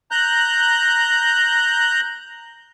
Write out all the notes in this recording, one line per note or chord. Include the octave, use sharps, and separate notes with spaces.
A#5 F#6 G6